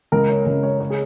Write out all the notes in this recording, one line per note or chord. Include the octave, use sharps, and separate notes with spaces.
C#2 A#4
C#5
C#2 A#4
C#5
C#5
G#4